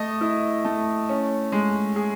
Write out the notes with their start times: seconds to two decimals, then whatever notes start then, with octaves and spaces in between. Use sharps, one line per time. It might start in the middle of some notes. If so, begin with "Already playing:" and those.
Already playing: A3 D#5
0.21 E4
0.65 A3
1.09 C#4
1.52 G#3
1.96 G#4